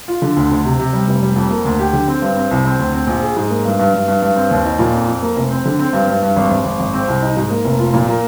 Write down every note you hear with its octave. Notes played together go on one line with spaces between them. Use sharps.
F4
D3
D2
D2
C3
C3
G3
F1
G3
F2
A#3
D2
G4
D3
C4
G2
C4
C2
C4
D2
C4
A#1
G#4
G#2
A#3
G2
G2
G2
G2
G2
C4
D#2
D#4
A#2
F2
F2
A#3
F1
C4
D3
C4
G2
G2
G2
G#1
G#1
G#1
G#1
C4
C2
D#4
G#2
A#3
F1
F4
A#2
A#3